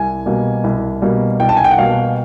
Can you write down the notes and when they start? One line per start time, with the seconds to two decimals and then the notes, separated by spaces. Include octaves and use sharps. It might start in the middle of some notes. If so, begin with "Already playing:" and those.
Already playing: C2 G#5
0.26 B2 G3 A#3
0.64 C2
1.02 B2 G3 A#3
1.40 C2 G5
1.49 A5
1.57 G#5
1.64 G5
1.71 F#5
1.78 B2 G3 A#3 F5